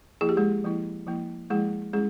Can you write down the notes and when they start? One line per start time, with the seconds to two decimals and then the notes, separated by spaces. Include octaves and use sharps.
0.21 F3 A#3 E4 G#4
0.29 G4
0.37 G#3 G#4
0.64 F3 A#3 E4
1.07 F3 A#3 E4
1.50 F3 G#3 A#3 E4 G#4
1.93 G3 G#3 C#4 E4 G#4